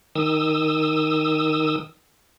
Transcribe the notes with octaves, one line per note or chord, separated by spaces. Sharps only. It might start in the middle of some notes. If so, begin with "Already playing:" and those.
D#3 D#6 E6